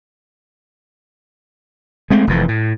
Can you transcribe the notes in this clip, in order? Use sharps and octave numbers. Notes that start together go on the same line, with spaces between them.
G#3 A3 C4
F1 F2 E3
A2